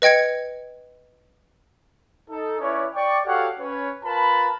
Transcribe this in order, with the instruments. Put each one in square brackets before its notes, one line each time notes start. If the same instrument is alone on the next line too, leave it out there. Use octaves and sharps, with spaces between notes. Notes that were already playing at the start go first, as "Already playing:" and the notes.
[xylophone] B4 D#5 G5 G#6 C#7
[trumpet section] D#4 A4
C#4 E4 B4 C#5 D5
D5 G5 C#6
F#4 G4 A4 C#5 F5 F#5
C#4 B4 C#5
F4 A#4 B4 A5 B5